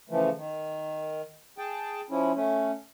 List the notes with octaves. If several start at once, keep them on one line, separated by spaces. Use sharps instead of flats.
C#3 E3 F3 A3
D#3
G#4 G5 A5
F3 C#4 E4
A3 C#4